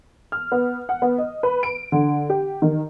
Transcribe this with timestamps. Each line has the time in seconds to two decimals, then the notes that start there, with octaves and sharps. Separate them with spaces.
0.32 F6
0.52 B3
0.89 F#5
1.02 B3
1.18 D#5
1.43 B4
1.63 D7
1.92 D3
2.30 G4
2.62 D#3